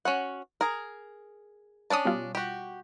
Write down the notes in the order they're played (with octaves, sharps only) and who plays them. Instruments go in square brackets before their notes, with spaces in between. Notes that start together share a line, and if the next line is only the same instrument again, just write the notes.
[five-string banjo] C#4 F#4 F#5
G#4 A#4
[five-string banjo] C#4 D4 A5 [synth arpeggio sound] D6 D#6
[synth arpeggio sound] B2 G3 F4
[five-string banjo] F#4 G4